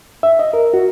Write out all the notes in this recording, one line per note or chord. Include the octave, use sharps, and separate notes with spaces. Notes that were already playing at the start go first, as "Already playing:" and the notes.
E5
D#5
A#4
F#4